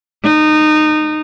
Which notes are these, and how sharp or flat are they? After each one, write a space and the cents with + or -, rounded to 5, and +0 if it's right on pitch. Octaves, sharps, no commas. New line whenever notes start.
D#4 -20